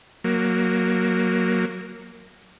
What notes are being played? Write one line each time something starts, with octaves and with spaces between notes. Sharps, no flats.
F#3 A#3